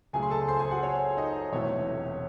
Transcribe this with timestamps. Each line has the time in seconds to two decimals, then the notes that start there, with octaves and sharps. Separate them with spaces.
0.13 C#2 C#3 F#3 A3 G#4 G#5
0.23 C6
0.30 A4 A5
0.48 C5 C6
0.59 G#4 G#5
0.71 F#4 F#5
0.83 C#5
1.17 D#4 D#5
1.52 E1 E2 C3 F#3 A3 C#5